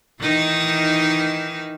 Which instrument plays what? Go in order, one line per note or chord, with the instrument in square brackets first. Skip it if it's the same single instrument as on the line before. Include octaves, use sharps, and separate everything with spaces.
[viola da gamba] D#3 E3 D#4